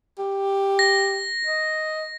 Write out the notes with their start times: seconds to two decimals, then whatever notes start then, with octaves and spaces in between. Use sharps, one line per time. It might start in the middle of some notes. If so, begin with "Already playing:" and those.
0.18 G4
0.79 A#6
1.46 D#5